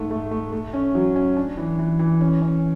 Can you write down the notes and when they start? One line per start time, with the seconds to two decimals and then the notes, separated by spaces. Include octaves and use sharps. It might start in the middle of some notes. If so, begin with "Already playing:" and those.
Already playing: G#2 A3
0.11 A3
0.31 A3
0.52 A3
0.74 C#4
0.95 F#3
1.16 C#4
1.37 D4
1.57 E3
1.79 E3
1.99 E3
2.21 C#4
2.42 C#4